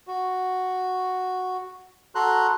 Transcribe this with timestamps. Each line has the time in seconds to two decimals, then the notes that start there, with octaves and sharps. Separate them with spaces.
0.07 F#4
2.15 F#4 A4 A#5 C6 F#6